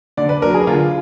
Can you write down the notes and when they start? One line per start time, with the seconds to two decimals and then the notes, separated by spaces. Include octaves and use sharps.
0.17 D3 D5
0.29 B4
0.42 F#3 D4 A#4
0.54 G#4
0.67 D3 F4